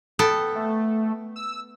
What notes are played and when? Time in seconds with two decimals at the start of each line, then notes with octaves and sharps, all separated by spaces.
0.19 B3 A4 G5
0.55 A3
1.36 E6